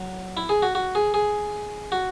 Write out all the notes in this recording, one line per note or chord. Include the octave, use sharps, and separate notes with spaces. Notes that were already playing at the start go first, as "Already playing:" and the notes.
Already playing: F#3
E4
G#4
F#4
F#4
G#4
G#4
F#4